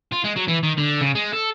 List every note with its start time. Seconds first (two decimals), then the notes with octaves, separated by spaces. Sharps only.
0.12 F4
0.24 G#3
0.36 F#3
0.48 E3
0.63 D#3
0.78 D3
1.01 C#3
1.15 G#3
1.33 A4